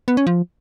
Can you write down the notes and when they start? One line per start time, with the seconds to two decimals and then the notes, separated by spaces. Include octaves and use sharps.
0.08 B3
0.17 C#4
0.27 F3